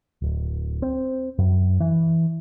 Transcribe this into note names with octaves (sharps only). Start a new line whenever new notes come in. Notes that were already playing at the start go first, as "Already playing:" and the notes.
D1
C4
F#2
E3